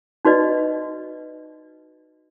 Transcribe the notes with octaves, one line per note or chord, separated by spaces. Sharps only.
D#4 F#4 B4 D5 D#5